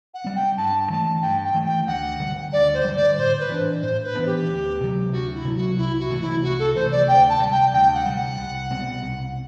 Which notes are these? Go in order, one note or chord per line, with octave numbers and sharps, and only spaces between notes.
F#5
G3 C4
G5
G2 A5
E3 A3 A5
G2 G5
G5
E3 A3
G5
D2 F#5
D3 G3
D2 D5
C5
D3 G3
D5
A2 C5
B4
E3 B3 D4
A2 C5
B4
E3 B3 D4
G4
D2
C3 F#3
D2 F#4
E4
C3 F#3
F#4
C2 E4
F#4
C3 E3 A3
E4
C2 F#4
A4
C3 E3 A3 C5
D5
D2 G5
A5
C3 G3
G5
D2 G5
F#5
C3 G3
F#5
C2
B2 G3 C4
C2